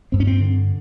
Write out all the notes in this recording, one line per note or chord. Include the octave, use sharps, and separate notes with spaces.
G2 C4
C#4
C4
D3